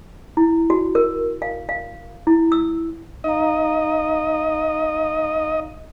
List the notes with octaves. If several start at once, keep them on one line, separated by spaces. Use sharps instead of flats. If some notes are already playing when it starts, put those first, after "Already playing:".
E4
F#4
A#4
F5
F5
E4
E6
D#4 D#5 F5 A#5